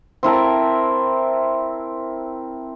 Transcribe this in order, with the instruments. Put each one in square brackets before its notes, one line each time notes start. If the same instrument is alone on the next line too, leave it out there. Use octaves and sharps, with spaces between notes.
[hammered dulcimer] C4 E4 A#4 A5